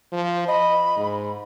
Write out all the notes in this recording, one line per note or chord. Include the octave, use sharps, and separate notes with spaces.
F3
D#5 B5
G#2